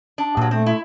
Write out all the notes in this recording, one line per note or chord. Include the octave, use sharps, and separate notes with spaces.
D4
G2 A#2 F#3
A3 C4
E4